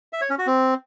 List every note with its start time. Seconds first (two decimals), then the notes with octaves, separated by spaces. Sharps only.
0.13 E5
0.21 C#5
0.30 C#4
0.38 F#4
0.47 C4